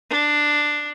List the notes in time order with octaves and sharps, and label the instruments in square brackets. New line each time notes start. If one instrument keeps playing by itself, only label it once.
[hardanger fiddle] D4